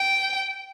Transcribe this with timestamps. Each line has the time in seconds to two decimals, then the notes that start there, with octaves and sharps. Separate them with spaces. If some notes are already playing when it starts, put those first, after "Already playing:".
Already playing: G5